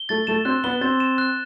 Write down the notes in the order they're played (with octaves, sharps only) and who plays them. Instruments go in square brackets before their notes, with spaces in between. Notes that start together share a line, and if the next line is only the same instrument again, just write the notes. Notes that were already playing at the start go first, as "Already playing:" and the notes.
Already playing: [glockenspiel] G7
[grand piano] A3 [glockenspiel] A6
[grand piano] A3 [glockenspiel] E7
[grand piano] C4 [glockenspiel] F#6
[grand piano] B3 [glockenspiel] G7
[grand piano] C4 [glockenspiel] A6
[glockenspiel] E7
F#6